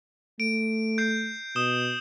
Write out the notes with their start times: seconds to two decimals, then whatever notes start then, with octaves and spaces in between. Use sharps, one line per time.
0.40 A3 D7
0.98 G6 C7 D7
1.56 B2 D#6 E7 G7